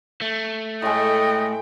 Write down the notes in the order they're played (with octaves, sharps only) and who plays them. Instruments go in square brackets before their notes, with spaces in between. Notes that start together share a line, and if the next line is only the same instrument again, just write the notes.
[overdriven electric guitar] A3
[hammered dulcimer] A2 G#3 [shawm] D#5 [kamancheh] G5